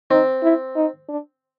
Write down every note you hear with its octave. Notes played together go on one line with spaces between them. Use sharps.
C4 D#4
E4
D#4
D4